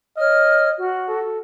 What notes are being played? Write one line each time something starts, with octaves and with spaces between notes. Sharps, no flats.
C#5 D#5 F6
F#4
A4